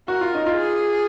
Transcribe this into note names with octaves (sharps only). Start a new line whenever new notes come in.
F#4 A#4
F4
D#4
F4
G#4